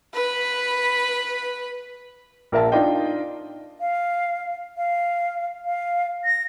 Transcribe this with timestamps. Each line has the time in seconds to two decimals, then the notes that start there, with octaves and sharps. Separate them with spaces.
0.13 B4 B5
2.52 A#1 A#4 E5 A5
2.72 D4 D#4 F4 D5 D#5 G5
3.80 F5
4.77 F5
5.65 F5
6.25 A#6